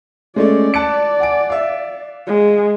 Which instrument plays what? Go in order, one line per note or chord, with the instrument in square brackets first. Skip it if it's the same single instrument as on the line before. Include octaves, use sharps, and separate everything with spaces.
[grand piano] G#3 A3 C#4 [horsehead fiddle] D5
[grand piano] A5 F#6 C#7
F#5 G#5 D7
E5 F5
[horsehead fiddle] G#3